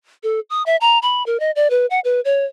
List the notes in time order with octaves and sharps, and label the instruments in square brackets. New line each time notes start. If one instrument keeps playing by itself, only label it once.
[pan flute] A4
D#6
E5
A#5
B5
A#4
D#5
D5
B4
F#5
B4
C#5